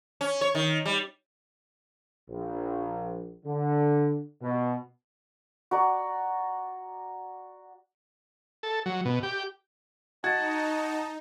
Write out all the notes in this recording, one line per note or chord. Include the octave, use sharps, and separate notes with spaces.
C#4
C#5
D#3
G3
A#1
D3
B2
F#4 D5 A#5
A4
F#3
B2
G4
D#4 F#4 D#5 A5 G#6 A6